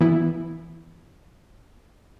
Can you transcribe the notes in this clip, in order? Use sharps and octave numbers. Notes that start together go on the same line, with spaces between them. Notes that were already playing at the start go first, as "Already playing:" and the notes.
E3 B3 E4